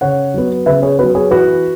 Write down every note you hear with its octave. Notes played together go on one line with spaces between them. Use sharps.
C#3 C#5 F#5
F#3 B3
C#3 B4 E5
G#4 C#5
F#3 B3 F#4 B4
G#4 C#5
E3 F#4 B4